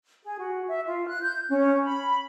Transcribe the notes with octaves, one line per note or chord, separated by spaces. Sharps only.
G#4
F#4
E5
F4
F#6
G6
C#4
B5